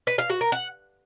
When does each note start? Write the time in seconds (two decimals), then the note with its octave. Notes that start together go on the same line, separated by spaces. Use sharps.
0.07 B4
0.18 F5
0.30 F#4
0.41 A#4
0.52 F#5